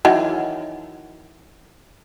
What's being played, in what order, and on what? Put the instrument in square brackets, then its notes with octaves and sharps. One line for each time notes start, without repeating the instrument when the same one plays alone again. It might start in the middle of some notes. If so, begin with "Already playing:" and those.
[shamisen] D#3 E3 F#3